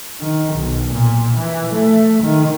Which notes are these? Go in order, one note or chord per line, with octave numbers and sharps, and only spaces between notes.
D#3
B1
A#2
E3
A3
D#3